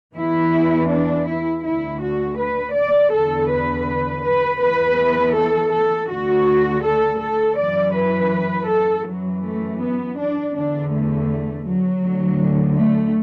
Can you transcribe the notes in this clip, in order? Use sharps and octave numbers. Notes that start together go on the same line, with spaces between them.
E2 E3 E4
D4
E4
D2 D3 E4
F#4
B4
D5
E2 D3 A4
B4
B4
E2 E3 B4
A4
A4
D2 D3 F#4
A4
A4
F#2 E3 D5
B4
A4
F#2 E3 F#3
A3
B3
D4
E2 D3 D4
A3
F#3
D2 D3
A3